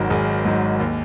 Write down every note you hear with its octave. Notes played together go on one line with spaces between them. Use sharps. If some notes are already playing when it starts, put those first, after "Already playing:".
Already playing: G#1 G#2 F#3 A#4
G#1 G#4
G#2 F#3
D#2